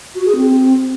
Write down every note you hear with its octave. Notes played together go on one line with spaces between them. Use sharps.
F#4
G#4
C4